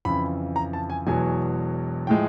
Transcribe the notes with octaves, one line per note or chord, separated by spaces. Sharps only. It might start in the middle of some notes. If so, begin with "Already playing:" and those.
F2 C#3 E3 B5
A#5
A5
G#5
E1 E2 B2 F#3 G#5
A2 F3 G#3 G5